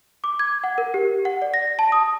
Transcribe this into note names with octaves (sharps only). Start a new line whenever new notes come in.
D6
G#6
F#5
A#4
G4
F#5
D5
A#6
A5
D#6